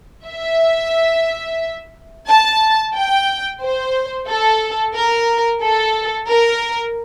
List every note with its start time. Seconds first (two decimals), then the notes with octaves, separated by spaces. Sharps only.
0.27 E5
2.27 A5
2.94 G5
3.62 C5
4.28 A4
4.95 A#4
5.62 A4
6.29 A#4